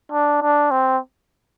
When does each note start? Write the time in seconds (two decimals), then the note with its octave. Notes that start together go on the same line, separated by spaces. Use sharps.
0.12 D4
0.42 D4
0.71 C4